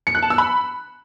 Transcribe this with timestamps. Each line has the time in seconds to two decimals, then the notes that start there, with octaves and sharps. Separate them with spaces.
0.07 C#7
0.15 F#6
0.23 A5
0.30 E6
0.38 B5